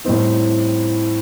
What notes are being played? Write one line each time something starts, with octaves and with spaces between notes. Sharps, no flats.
A2 G3 C4 D#4